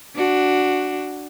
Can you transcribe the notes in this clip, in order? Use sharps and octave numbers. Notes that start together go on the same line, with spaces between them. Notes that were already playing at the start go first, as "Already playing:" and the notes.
D4 F#4